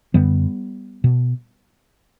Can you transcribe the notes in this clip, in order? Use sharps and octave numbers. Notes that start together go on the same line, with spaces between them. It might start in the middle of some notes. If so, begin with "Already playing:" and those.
F#2 D3 G3 B3
B2